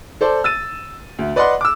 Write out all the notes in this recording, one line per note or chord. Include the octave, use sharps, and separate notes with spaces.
A4 C5 D5
E6 A6 D#7
D2
B4 D5 D#5 F#5 C6
D6 E6